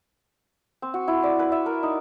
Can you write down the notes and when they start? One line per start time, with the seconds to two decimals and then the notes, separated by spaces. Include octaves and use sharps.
0.82 C4
0.94 F#4
1.08 E4
1.23 D5
1.39 B4
1.52 E5
1.66 A#4
1.83 D#4